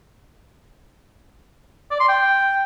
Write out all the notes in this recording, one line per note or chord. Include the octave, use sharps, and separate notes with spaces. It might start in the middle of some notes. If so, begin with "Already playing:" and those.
D5
C6
G5